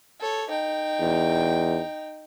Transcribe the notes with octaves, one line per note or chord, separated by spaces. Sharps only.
A4 C#5
D#4 G5
E2